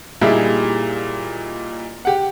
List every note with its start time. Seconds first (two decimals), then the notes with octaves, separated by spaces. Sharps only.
0.21 A#2 G3 D#4 E4 G#4
2.05 G4 F#5